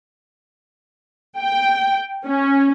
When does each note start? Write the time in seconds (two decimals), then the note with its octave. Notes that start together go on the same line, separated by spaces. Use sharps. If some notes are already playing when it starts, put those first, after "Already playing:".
1.38 G5
2.26 C#4